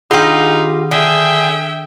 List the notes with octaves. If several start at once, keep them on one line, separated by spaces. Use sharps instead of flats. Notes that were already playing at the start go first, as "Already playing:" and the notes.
D#3 D4 D#4 F4 G4
D3 G#4 E5 G5